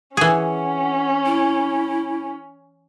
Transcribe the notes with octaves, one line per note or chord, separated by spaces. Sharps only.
E3 C#4 G#4 F#5
E4